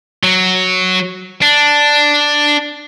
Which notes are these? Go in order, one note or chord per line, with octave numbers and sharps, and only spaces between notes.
F#3
D4